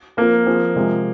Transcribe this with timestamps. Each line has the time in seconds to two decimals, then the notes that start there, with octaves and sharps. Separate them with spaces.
0.17 F3 A#3 C4 F4 A#4
0.46 F3 C4 G#4
0.76 C3 F3 G#3